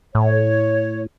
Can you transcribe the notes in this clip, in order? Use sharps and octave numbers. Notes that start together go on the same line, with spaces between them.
A2 C#5